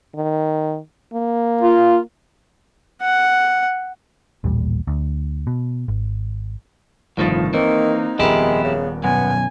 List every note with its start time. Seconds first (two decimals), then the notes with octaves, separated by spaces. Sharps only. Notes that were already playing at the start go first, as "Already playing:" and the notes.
0.15 D#3
1.14 A#3
1.61 F4
3.02 F#5
4.44 A1 D#2 A#2 G3
4.87 D2
5.47 B2
5.88 G#1
7.17 G1 C2 A2 D#3 F3 A6
7.54 D#3 E3 A#3 C4 D#4
8.19 D#1 F2 G#3 B3 E4 G4 A#4
8.64 C#3
9.04 B1 F#2 B3 G#5